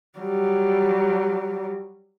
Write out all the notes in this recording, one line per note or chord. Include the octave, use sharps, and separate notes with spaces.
F#3 G3